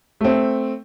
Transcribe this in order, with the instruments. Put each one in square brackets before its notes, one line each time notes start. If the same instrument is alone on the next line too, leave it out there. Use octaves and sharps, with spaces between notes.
[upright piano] A3 C4